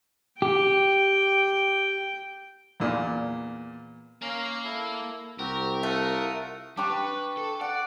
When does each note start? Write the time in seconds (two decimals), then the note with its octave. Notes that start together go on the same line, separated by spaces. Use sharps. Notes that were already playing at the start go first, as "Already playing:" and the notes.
0.42 G4 G5
2.80 E2 A#2
4.22 A#3 C#4 F5 A#5
4.65 E4 A4
5.39 C2 C4 F#4 G4 A#4
5.83 A3 F4 F#5 D#6
6.77 G3 D4 G5 C#6
6.90 B4
7.37 A4
7.61 D5 F#5